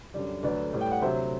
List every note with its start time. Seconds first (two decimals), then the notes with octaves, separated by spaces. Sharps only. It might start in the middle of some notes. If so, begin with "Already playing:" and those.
0.14 F#2 D3 G3
0.43 D2 D3 F#3 B4 D5
0.73 A2 G3
0.81 G5
0.91 F#5
1.02 D2 C3 F#3 C5 E5